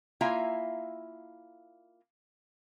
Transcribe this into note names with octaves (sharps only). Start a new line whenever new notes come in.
A#3 E4 F4 E5 G#5 A#5